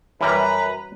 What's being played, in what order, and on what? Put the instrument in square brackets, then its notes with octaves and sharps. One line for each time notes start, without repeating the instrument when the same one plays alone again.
[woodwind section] F#2 B4 [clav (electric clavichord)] E3 G3 A#4 [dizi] A#5